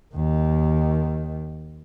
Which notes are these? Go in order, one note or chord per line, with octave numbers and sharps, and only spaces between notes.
D#2 D#3